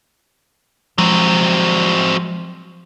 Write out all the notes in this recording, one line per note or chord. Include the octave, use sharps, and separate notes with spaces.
F3 F#3 G#3 C4